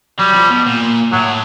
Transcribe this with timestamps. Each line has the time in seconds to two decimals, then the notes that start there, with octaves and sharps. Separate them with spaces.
0.19 F#3 G3
0.35 F3
0.50 B2
0.66 A#2
1.12 A2 F#3